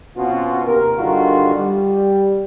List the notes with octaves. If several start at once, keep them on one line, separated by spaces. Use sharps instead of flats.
B2 C4 C#4 F4 F#4
D#2 C3 A#4
G2 D3 D#3 F4 F#4
G3